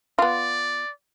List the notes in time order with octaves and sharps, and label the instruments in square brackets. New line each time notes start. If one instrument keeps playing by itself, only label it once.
[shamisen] B3 F4 [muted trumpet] D5